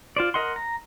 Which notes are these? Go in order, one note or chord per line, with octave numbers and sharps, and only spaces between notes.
F4 C5 D5
A#4 D#5 F#5 C6
A#5